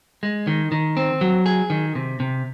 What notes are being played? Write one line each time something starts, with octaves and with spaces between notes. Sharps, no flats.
G#3
D#3
D#3
C4
F#3
G#4
D#3
C3
C3